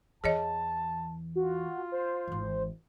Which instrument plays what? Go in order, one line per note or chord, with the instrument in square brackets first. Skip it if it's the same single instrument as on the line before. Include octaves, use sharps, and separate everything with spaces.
[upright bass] E2 E3 [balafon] G#4 C#5 D#5 [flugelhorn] A5
[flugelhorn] F4 [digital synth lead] F#4
[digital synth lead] C5
[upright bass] G#1 E3